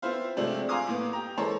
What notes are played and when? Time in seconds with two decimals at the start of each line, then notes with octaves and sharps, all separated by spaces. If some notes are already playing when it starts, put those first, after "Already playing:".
0.02 B3 C4 E4 F4 C5 F5
0.37 C3 F3 G#3 A3 C4 D4
0.69 F5 G#5 A#5 C6 D6 D#6
0.87 A2 A#3 B3
1.13 G4 A#5
1.38 E3 G#3 A4 A#4 C5 C#5